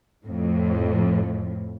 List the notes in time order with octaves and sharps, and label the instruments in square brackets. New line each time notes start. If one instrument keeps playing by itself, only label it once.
[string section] F2 A2